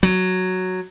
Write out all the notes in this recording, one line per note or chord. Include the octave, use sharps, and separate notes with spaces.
F#3